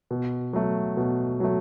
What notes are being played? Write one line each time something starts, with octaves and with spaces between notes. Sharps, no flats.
B2
F#3 A3
B2
F#3 A3